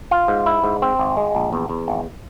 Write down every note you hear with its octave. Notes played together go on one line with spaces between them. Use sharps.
F4
G#2
E4
G#2
C4
G#1
G#3
A#1
E2
E2
G#1